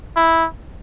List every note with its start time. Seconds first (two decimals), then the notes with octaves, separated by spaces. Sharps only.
0.16 E4